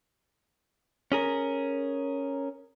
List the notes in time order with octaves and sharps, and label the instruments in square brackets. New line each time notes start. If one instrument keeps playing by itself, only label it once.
[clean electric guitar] C#4 G#4 A#4